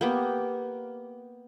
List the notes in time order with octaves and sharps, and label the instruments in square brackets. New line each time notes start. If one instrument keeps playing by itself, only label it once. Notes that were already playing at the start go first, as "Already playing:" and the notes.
[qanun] A#3 B3 G4